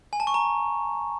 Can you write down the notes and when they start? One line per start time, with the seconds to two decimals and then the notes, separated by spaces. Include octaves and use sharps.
0.13 G#5
0.20 A5
0.27 C#6
0.34 A#5